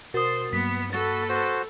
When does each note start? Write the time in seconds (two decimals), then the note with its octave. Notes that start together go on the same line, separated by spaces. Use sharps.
0.14 B2 F#4 A#4 C5 D#6 A6
0.53 G2 F#3 A#3 B3 B6
0.93 F#4 A4 B4 A6
1.29 F#4 C5